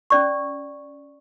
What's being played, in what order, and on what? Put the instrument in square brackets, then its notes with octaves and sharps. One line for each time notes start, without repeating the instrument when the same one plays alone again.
[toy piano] C#4 D5 C#6